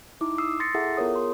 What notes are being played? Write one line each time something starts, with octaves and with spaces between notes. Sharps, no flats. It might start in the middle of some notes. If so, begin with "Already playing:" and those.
D#4 E4 D6
D#6 E6 C7
C6 E6 A6 A#6 C7 C#7
E4 G#4 A4 E5 F#5
B3 F4 G#4 A#4 C#5 D#6
C6